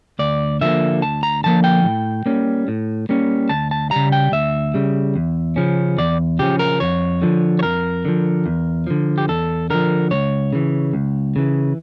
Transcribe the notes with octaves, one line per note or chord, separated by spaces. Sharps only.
D2 D5
D3 F3 A#3 E5
D2 A5
A#5
D3 F3 A#3 A5
G5
A2
G3 A#3 C#4
A2
G3 A#3 C#4
D2 A5
A5
C#3 G3 A#5
G5
D2 E5
C#3 G3
E2
C#3 F3 C#4
E2 D5
C#3 F3 C#4 G4
A#4
F2 C#5
D3 F3
C#5
F2 A#4
D3 F3
E2
D3 F3
G4
E2 A4
D3 F3 A#4
C#2 C#5
C#3 E3
C#2
C#3 E3